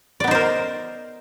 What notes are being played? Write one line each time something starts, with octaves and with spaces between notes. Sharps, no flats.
B3 D#4 A#4 C5 D5